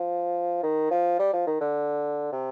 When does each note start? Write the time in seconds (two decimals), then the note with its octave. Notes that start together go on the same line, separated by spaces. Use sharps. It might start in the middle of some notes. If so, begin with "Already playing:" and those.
Already playing: F3
0.63 D#3
0.91 F3
1.19 G3
1.33 F3
1.47 D#3
1.61 D3
2.32 C3